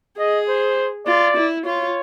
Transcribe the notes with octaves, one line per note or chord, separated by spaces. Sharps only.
G#4 D#5
C5
F4 D5
E4
F4 C#5